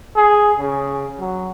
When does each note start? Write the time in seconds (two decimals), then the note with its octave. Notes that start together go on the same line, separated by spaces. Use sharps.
0.16 G#4
0.59 C#3
1.20 F#3